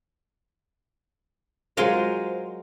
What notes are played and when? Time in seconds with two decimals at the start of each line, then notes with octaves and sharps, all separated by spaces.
1.77 F#3 G#3 F4 A#4 C5 F5